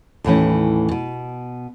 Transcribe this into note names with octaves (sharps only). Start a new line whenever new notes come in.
D#2 A2 E3 C#4
B2